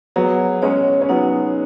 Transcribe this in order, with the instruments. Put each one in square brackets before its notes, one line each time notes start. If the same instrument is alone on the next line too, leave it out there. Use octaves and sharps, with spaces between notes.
[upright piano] F#3 B3 [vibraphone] G#4
[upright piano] G#3 C#4 [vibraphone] C#5
[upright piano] C#4
[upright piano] F#3 B3 [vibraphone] D#4